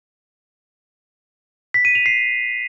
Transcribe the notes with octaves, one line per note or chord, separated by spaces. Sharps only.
B6
D#7
F7
C7